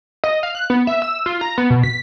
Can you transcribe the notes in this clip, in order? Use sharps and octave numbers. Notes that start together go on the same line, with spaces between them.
D#5
F5
F#6
B3
E5
E6
F4
A#5
B3
B2
B6